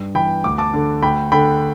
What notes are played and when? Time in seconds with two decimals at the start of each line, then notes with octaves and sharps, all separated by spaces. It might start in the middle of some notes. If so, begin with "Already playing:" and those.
Already playing: G2
0.15 E3 G5 B5
0.44 D2 D6
0.58 A5 D6
0.73 D3
1.02 D2 G5 B5
1.32 D3 G5 B5